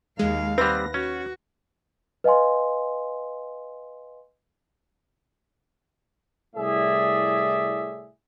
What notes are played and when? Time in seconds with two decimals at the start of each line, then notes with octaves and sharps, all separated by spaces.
0.19 D#2 G#3 F5
0.58 G3 C4 B4 A#6
0.94 C#4 F#4
2.24 B4 D#5 F5 G#5 C6
6.55 C2 A2 G#4 D5 E5